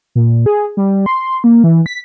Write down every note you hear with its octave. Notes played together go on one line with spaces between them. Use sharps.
A#2
G#4
G3
C6
A#3
E3
B6